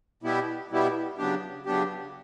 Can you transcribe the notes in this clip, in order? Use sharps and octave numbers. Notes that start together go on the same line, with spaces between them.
B2 G3 B3 E4 G4
B2 G3 B3 E4 G4
C#3 F#3 B3 D4 G4
C#3 F#3 B3 D4 G4